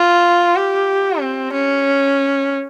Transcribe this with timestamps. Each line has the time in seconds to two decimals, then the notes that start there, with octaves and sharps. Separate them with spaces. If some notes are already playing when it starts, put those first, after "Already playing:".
Already playing: F4
0.56 G4
1.20 C4
1.53 C#4